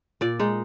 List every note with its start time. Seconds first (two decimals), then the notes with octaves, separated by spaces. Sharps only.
0.21 A#2 D5
0.39 G#3 D#4